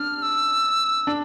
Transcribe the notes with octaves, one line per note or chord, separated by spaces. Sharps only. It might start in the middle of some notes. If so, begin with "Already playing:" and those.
Already playing: D4 F6
E6
D4